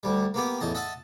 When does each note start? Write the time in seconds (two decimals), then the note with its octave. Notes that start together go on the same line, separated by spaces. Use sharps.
0.03 D2 G3
0.34 A#3 B3 G4
0.61 A1 E2 D#5 A5
0.75 D#5 E5 F#5 A5